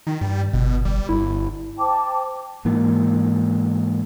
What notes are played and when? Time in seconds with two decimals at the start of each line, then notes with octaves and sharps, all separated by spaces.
0.07 D#3
0.21 G2 G3
0.53 G1 B2
0.85 G1 G3
1.09 G1 E4
1.78 C5 G5 A5 D6
2.65 G#2 E3 A#3